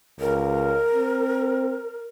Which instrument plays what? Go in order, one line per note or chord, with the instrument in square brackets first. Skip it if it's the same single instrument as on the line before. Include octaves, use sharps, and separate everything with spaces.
[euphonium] C#2 [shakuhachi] A#4
[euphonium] C4